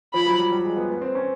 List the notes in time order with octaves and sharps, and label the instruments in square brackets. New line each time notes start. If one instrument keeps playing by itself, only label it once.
[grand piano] F3 [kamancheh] B5
[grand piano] F#3
G3
G3
G#3
B3
B3
C4
C#4